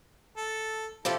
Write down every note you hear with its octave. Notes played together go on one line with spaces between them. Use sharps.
A4
C3 F3 E4 G4 A4